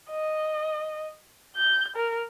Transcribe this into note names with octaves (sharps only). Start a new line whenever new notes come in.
D#5
G6
A#4